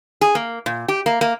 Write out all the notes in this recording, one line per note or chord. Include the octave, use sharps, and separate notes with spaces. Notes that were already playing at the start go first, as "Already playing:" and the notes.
G#4
A#3
A#2
G4
A#3
A#3